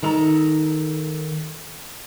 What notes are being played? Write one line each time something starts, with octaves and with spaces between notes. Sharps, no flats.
D#3 A4 A#5